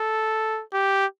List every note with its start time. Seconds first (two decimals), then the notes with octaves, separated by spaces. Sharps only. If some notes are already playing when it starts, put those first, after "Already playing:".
Already playing: A4
0.73 G4